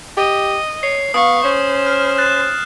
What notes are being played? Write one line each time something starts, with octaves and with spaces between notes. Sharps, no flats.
G4 D#5
C#5 C7
B3 F5 C#6 D#6
C#4 C5
F6
F#6 A6 E7